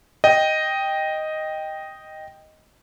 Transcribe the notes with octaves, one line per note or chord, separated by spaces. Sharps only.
D#5 G5